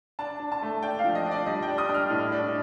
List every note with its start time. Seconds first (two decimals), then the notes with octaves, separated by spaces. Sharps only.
0.19 D4 A5
0.40 D4
0.52 A5
0.62 A3
0.83 D4 G5
0.99 F5
1.04 F3
1.15 D#5
1.26 D4
1.31 D5
1.46 G3 D#5
1.63 G5
1.68 D4
1.78 D#6
1.89 D4
1.94 F6
2.10 A2
2.32 D4